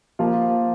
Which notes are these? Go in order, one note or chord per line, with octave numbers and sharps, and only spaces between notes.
F3 A#3 F4